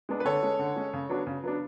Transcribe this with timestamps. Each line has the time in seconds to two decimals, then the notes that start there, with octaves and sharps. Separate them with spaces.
0.09 G#3 B3 D4
0.20 B4
0.25 D3 A4 C#5
0.43 G#3 C#4
0.59 D3
0.76 G#3 C#4
0.93 C#3
1.09 F#3 B3 D4
1.27 C#3
1.43 F#3 B3 D4